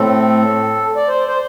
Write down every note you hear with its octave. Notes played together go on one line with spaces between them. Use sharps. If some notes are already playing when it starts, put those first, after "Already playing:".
Already playing: A2 A3 C4 A4
D5
C5
C5